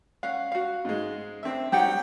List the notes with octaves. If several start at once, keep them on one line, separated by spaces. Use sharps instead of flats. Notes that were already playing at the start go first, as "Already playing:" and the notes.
C#4 F5 F#5
F#4 F5
G#2 G#3
C4 D4 E5
F#3 G3 D#4 G4 F#5 G5